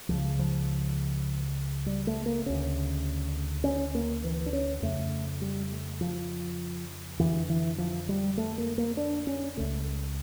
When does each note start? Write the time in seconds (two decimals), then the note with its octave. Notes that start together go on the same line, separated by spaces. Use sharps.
0.09 C#2 C#3 F3
0.39 F3
1.86 G3
2.07 A3
2.26 A#3
2.46 D2 C#3 C#4
3.64 C#4
3.95 A#3
4.24 E3
4.46 D4
4.53 C#4
4.82 F2 C#3 A3
5.42 G3
5.72 A3
6.01 F3
7.19 F2 D3 E3
7.50 E3
7.78 F3
8.09 G3
8.37 A3
8.58 A#3
8.78 A#3
8.97 D4
9.27 C#4
9.57 C#2 C#3 A3